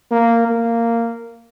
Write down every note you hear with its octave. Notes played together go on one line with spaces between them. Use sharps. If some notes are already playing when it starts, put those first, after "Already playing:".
A#3
A#3